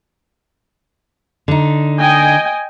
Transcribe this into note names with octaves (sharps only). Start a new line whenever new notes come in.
D3 D#4
D#5 G5 G#5